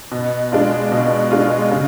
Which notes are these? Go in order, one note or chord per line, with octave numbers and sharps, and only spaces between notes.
B2
G#3 D4 F4
B2
G#3 D4 F4
C#3